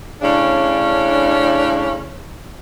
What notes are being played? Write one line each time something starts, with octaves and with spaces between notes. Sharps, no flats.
A2 C#3 C#4 D4